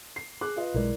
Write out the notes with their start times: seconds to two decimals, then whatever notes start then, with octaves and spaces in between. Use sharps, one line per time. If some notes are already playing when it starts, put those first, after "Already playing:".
0.16 C7
0.41 G#4 D6 F#6
0.56 F4 B4 D#5
0.74 B1 D#3 G#3 E4 A#4 D5